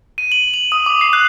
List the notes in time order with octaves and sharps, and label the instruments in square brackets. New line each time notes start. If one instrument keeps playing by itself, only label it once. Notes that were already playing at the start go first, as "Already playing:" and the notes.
[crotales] D#7
F#7
F7
D#6
D6
C7
F#6